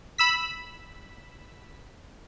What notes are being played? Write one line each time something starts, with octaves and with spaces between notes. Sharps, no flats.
B5 E6 B6